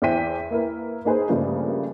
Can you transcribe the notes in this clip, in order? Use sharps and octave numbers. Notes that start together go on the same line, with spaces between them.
E2 E4 C5 G5 B6 D#7
A#3 E4 A#4 B4
A#3 D#4 G#4 B4 C5
G2 C#3 F3 A3 A#3